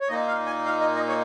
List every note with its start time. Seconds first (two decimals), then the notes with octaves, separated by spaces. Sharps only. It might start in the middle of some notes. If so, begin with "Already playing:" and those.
0.01 C#5
0.08 A#2 A#3 D#4 D#5
0.27 F5
0.46 G#5
0.66 F5
0.80 D#5
0.95 D#5
1.08 C#5